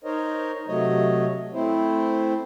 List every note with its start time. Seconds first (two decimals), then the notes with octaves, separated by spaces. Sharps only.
0.04 D#4 A#4 C5 C#5 D#5
0.68 C3 F#3 A3 C#5 D#5
1.54 A3 C4 E4 C5